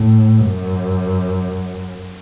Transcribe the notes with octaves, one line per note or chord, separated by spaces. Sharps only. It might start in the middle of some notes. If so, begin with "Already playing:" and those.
Already playing: A2
F#2